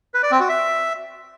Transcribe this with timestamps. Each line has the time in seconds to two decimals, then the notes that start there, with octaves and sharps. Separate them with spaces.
0.14 B4
0.23 D5
0.31 C4
0.40 F#4
0.49 E5